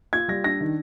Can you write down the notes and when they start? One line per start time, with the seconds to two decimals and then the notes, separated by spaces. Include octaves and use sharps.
0.13 F4 G#6
0.28 G3 A#6
0.44 D4 A#6
0.60 D#3